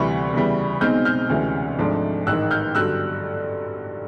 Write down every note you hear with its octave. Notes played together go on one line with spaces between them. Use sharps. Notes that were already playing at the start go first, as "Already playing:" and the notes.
Already playing: D2 C3 E3 G3 B5 C#6
E2 C#3 E3 G3
B1 B2 G#3 C4 D#4 F6 G6
F6 G6
D2 C3 E3 G#3 C#4
G#1 G#2 F3 A3 D4
A1 G#2 D#3 E6 F#6
F6 G6
G2 D3 F#3 E6 F#6